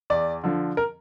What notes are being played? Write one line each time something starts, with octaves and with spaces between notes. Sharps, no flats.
E2 D5
D3 F3
A#4